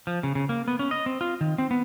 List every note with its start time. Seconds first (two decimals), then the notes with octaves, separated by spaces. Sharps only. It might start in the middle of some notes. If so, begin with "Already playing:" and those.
0.07 F3
0.23 C#3
0.35 C#3
0.49 A#3
0.68 B3
0.79 C#4
0.91 D#5
1.06 C4
1.21 F4
1.41 D#3
1.58 C4
1.71 B3